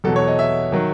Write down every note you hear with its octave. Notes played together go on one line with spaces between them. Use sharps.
E2 B2 F#3 A4
C#5
D#5
E5
D#3 F#3